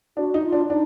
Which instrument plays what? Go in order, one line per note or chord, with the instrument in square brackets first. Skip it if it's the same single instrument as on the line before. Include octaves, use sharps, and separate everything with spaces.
[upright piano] D4 [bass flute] F#4
[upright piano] D#4
[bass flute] F4
[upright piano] D4
[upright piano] D4 [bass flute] D#4